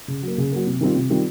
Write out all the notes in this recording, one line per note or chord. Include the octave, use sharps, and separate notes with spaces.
C#3
F#3 A#3
C#3
F#3 A#3
C3
D#3 G3 C4 F4
C3
D#3 G3 C4 F4